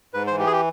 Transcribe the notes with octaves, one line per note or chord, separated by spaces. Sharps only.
G#2 B4
C5
E3
G4
G#4
G4